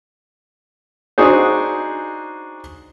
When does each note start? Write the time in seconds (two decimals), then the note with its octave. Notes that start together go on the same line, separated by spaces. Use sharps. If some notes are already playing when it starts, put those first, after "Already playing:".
1.18 D4 D#4 F#4 G#4 C5